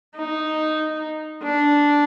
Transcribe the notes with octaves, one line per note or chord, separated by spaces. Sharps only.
D#4
D4